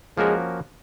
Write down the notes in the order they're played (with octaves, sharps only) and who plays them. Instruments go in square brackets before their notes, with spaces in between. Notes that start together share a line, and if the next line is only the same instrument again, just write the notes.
[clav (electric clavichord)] F3 A#3 C#4 F#4 A#4 [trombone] G#3